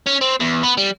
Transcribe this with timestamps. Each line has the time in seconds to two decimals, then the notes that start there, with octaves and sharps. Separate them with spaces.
0.07 C#4
0.21 C4
0.40 E2
0.63 B3
0.77 G3